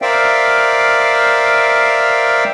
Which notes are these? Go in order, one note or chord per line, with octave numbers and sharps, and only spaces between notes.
A#4 C5 D5 E5 F5 G5